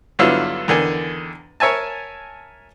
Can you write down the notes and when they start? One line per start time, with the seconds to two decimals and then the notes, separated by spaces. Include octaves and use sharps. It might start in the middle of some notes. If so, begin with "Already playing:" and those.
0.19 G2 D3 F#3 B3 E4 F4
0.68 E2 D3 D#3 G#5
1.60 A#4 C#5 E5 G#5 A5